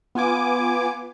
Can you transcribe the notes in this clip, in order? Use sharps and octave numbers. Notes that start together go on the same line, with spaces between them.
B3 F4 G#5 D6